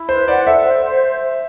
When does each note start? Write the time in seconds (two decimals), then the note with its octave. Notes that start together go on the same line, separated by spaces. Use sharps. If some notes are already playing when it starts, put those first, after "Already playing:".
Already playing: E4
0.09 B4 C5
0.28 D5 F#5
0.46 A4 E5
0.65 C5
0.84 C5